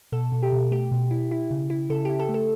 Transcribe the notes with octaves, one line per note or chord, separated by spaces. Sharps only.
B2 A4
B2
G4
B2
A3 G4
B2
E4
E4
C#3
E4
C#3 A4
E4 G4
A4
A3
A4